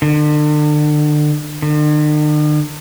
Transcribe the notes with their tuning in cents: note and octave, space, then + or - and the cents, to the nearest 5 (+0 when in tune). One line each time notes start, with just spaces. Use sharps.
D3 +35
D3 +45